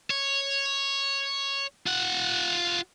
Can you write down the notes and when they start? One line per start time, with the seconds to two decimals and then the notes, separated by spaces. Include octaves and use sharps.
0.10 C#5
1.87 F4 F#5